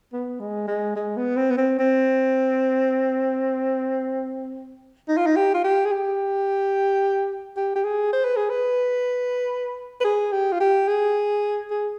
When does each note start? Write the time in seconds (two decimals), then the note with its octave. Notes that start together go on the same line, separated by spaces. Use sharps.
0.13 B3
0.40 G#3
0.67 G#3
0.96 G#3
1.17 B3
1.37 C4
1.50 B3
1.57 C4
1.79 C4
5.08 D#4
5.17 F4
5.27 D#4
5.36 G4
5.54 F4
5.64 G4
5.86 G#4
5.92 G4
7.57 G4
7.75 G4
7.84 G#4
8.13 C5
8.24 B4
8.36 G#4
8.49 B4
10.01 B4
10.04 G#4
10.32 G4
10.52 F4
10.60 G4
10.88 G#4
11.70 G#4